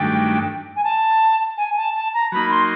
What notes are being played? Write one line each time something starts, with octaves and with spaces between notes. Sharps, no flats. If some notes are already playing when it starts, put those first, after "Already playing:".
Already playing: G2 D#3 F#3 A3 D4 G5
G#5
A5
G#5
A5
A5
A#5
F#3 A#3 D#4 B5
C6